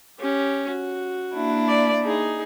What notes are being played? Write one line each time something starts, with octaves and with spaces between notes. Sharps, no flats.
C#4 G4
F#4
A#3 D4 E4
D5
D#4 G#4